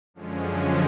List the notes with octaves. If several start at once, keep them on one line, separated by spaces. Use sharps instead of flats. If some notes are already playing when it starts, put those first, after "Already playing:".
F#2 D3 F3 G#3 C#4